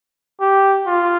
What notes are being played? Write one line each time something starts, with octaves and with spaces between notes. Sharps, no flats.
G4
F4